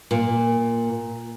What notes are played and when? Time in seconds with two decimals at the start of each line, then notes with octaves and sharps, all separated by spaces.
0.11 A#2